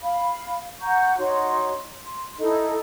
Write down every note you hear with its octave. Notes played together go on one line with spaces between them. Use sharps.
F5 B5
F#5 A#5 C#6 G6
D#4 F#4 C#5 C6
C6
D#4 E4 A4 D#5